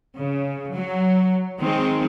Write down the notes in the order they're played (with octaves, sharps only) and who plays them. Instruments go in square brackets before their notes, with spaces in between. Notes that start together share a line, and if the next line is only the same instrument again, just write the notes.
[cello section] C#3
F#3
D#3 G#3 C4